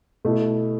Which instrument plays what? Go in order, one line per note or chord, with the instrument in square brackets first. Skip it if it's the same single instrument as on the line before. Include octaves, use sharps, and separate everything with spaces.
[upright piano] B2 A3 E4